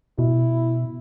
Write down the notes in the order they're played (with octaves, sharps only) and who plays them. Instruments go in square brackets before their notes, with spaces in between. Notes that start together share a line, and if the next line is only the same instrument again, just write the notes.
[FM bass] B2 [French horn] E4